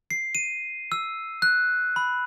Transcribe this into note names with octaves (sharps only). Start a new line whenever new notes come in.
C7
D#7
E6
F#6
B5